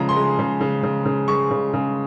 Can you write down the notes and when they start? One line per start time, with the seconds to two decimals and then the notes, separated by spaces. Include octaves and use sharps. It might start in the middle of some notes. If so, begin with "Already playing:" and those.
Already playing: C#3 F3 G#3 A#5
0.09 C6
0.16 G#3
0.39 C#3
0.61 C#3
0.83 C#3
1.05 C#3
1.28 G#3 C#6
1.51 C#3
1.73 C#3